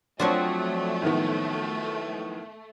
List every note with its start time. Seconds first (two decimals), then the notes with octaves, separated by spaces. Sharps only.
0.20 F3 F#3 A3 C4 D4
1.02 A2 D#3 B3